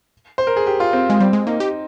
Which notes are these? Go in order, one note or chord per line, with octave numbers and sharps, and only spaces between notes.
C5
A#4
G#4
G4
F4
C4
G#3
G3 C4
G#3
A#3 D#4
G4